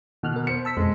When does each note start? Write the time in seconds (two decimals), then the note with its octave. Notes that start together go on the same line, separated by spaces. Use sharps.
0.23 B2 D#3 F6 F#6
0.36 A#4
0.47 C5 C#7
0.65 A5 E6 B6
0.77 F2 B2 G#3 B3